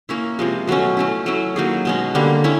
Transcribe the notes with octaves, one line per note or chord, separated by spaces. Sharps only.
A#3 C#4 E4
C3 F3 G#3
B2 F#3 A3 C#4
A3 C#4 E4
F#3 A3 C#4 E4
F#3 A#3 D#4 G#4
B2 G#3 C#4
D3 G3 A#3
C#4 E4